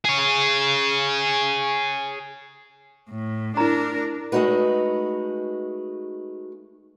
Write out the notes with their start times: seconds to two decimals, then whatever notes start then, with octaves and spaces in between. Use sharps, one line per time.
0.05 G#4 C#5
3.09 A2
3.57 D4 E4 A#4 A#5
4.32 G#3 A3 D#4 F#4 B4